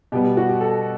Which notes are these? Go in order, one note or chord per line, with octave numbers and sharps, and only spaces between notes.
B2 G3 B3 G4
G4
F#4
G4
A4